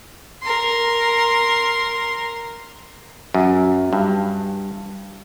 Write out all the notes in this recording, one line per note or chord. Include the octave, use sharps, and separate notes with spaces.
A#4 C6
F#2
G2